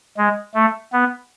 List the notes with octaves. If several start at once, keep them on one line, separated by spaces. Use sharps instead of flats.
G#3
A3
B3